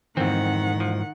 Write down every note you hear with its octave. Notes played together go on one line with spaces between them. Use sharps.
F2 G#2 D#3 E3 C4 F#5
F3